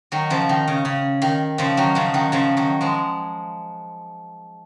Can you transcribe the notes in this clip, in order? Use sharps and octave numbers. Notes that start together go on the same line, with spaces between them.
D#3 F#3
C#3 F3
D#3
C#3
C#3
D#3
C#3 F3
D#3 F#3
C#3 F3
D#3 F#3
C#3 F3
D#3 F#3
F3 G#3